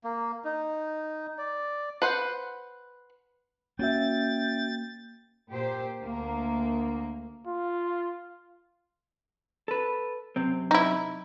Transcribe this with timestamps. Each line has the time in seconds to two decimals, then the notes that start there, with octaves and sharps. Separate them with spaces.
0.04 A#3
0.45 D#4
1.38 D5
2.02 B4 C5 F#5
3.79 A#3 C#4 F#4 E5 G5 A6
5.51 A#2 G4 C5
6.01 D2 A#3
7.47 F4
9.68 A4 B4
10.36 F#2 C3 C4
10.71 D#4 E4